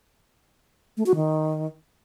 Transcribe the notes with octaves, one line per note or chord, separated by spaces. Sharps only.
A3
F#4
D#3